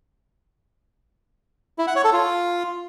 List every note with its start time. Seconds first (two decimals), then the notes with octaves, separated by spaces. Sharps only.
1.79 E4
1.87 F#5
1.96 C#5
2.04 A4
2.13 F4